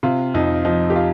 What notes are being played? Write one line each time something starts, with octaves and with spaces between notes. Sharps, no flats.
C3 F4
F2 D#4
F3 D#4
G4
F4